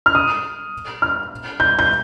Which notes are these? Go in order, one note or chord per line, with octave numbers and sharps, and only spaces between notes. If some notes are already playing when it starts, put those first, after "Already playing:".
F6
D#6
F6
G6
G6